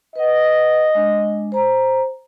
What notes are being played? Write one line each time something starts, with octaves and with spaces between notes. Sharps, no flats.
B4 D#5 F#5
G#3 D4
C5 A#5